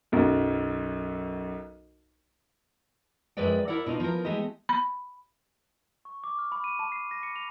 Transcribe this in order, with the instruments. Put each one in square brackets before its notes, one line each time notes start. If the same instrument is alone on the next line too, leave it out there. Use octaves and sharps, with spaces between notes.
[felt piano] B1 F#2
[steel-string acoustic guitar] F#2 F3 G#3 B4 D5 G5
E4 A#4 D5 F#5
B2 D4 D#4 F4
F3 B3 F4 A#4
G#3 A3 G4 D#5
[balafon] B5
[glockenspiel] C#6
D6
F6
B5
D#7
A5
C7
A#6
C#7
F7